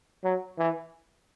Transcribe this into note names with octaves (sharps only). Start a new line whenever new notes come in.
F#3
E3